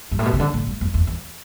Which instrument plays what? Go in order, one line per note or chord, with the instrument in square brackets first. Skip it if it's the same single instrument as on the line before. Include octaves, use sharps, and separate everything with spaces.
[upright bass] G2
A2
B2
C3
D3
A2
G2
F#2
E2
E2